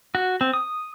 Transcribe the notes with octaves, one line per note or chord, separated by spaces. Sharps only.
F#4
C4
D#6